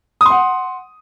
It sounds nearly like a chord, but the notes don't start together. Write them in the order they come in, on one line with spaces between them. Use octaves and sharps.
D#6 C6 F#5